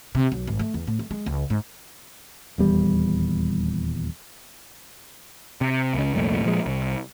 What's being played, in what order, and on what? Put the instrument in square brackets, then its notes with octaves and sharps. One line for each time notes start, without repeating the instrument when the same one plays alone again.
[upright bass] C3
B1
G#1
A3
E2
A2
A3
G#3
C#2
G#2
[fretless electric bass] D#1 E2 G3
[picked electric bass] C3
C#2 C#3
C2 F2 A#2 A3
A#2 F3 G#3
C2